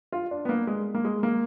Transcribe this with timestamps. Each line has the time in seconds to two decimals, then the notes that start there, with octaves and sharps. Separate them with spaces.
0.12 F4
0.31 D4
0.45 B3
0.49 A#3
0.67 G#3
0.94 A#3
1.05 G#3
1.23 A#3